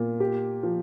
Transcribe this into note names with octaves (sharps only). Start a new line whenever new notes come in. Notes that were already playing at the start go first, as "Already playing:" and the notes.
Already playing: A#2
G4
F3